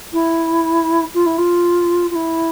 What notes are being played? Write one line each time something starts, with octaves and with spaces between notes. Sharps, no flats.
E4
F4
E4
F4
F4
E4